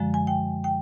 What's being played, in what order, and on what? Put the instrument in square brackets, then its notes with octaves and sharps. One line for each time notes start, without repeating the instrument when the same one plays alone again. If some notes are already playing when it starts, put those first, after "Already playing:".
Already playing: [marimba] F#2 D3 F3 G#3
G#5
G5
G5